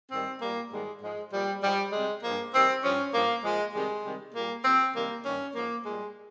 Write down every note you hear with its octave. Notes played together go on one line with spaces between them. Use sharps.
G#2 D#3 G3 C4
A#2 G3 A#3
G#2 D#3 G3 G#3
G#2 F3 G#3
A#2 F3 G3
G#2 F3 G3
C3 G3 G#3
G2 F3 A#3
C3 D#3 G3 C4
G2 F3 C#4
G2 F3 A#3
A#2 F3 G#3
C3 D#3 G3 G#3
C3 D#3 G3
A#2 G3 A#3
C3 F3 C4
C3 D#3 G3 A#3
G2 D#3 G3 C#4
G#2 F3 A#3
A#2 G3 G#3